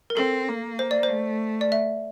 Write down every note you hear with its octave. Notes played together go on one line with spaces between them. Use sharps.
A#4
C4 A4
A#3
C5
D5
C5
A3
D5
E5